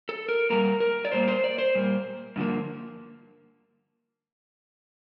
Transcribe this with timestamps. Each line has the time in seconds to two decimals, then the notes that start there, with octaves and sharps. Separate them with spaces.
0.09 A4
0.29 A#4
0.50 A#2 G3 A#3 A#4
0.80 A#4
1.05 D5
1.12 A#2 G3 A#3 C5
1.28 C5
1.44 D5
1.58 C5
1.75 A#2 G3 A#3
2.36 G2 D3 F3 A#3